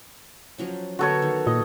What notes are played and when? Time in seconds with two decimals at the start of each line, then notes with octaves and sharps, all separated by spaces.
0.58 F3 F#3 C#4
0.99 D3 B3 F#4 A4 A#4 C#5
1.22 D#3
1.47 A#2 D#5